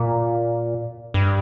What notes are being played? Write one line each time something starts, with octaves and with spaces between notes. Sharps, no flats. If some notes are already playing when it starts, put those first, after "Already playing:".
Already playing: A#2
G2